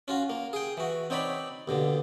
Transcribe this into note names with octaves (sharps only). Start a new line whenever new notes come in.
C#4 F4 F#4
A#3
G#4 G5
E3 F#4
C4 D#4 C#5 D5 B5
D#2 B2 D3